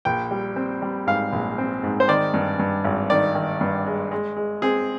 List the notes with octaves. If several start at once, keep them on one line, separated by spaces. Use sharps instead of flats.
A#1 G5
G3
C4
G3
G#2 F5
A#1
C4
G#2
C5
D#3 D5
G2
G2
G#1
D#3 D5
D#3
G2
G#3
G#3
G#3
C4 G#4